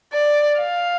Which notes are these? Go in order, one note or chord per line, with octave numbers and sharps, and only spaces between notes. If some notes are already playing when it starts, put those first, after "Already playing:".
D5
F5